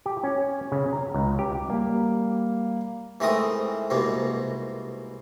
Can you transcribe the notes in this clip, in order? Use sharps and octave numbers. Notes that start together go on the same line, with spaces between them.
G4
C#4
C#3
A#5
C#2
G4
G3 A#3
G#2 E3 A3 C4 A#4 D#6
C2 G#2 B2 A#3